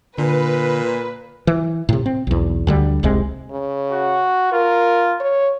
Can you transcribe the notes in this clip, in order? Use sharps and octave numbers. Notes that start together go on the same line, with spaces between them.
A#2 D3 B4
E3
A2 C3
C4
B1 E2
D2 D3 G3
F1 C2 C3 G#3
C#3
F#4
F4 A#4
C#5